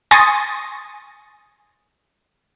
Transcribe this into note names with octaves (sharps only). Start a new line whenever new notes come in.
G#5 C6 C#6 D#6 A6 A#6